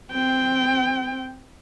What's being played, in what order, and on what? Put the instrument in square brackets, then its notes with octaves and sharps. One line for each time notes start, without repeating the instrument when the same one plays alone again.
[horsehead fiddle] C4 G5